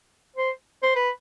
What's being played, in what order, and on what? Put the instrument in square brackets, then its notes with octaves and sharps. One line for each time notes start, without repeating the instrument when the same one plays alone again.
[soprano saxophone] C5
C5
B4